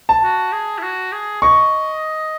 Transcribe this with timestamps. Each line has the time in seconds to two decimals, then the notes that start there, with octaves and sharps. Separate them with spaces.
0.09 A5
0.24 F#4
0.52 G#4
0.79 E4
0.83 F#4
1.12 G#4
1.42 D#5 C#6